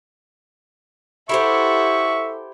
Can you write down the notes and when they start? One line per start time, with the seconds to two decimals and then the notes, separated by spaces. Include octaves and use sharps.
1.29 E4 G4 A4 C5 E5 F#5 C#6